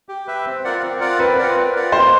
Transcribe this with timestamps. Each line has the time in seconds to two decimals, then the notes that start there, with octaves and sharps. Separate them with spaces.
0.09 G4
0.27 B4 E5 G5
0.46 C4
0.65 F4 A#4 D5 F#5
0.82 C4
1.00 F4 A#4 D5 F#5
1.19 C4 B4
1.38 F4 A#4 D5 F#5
1.56 C4
1.74 F4 A#4 D5 F#5
1.92 A#3 C5